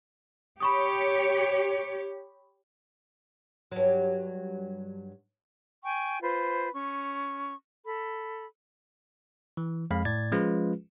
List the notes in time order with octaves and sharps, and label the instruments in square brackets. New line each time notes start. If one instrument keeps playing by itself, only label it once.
[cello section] G4 C#5 [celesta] B5 C#6 D#6
[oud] G2 F#3
[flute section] G5 G#5 C#6
F4 B4 C5
C#4 C#6
A4 B5
[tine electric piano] E3
F2 G#3 F5 B5
A2 D5 G#6 A6
F3 G#3 C#4 F4 G#4 B4